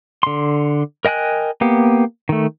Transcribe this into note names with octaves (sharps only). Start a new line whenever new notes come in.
D3 C6
A#4 D#5 G5 G#5 F#6
A#3 B3 G4
D#3 A3